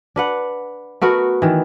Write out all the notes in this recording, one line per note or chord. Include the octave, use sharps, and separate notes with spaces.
D4 B4 F#5
A3 B3 F#4 A#4
D#3 E3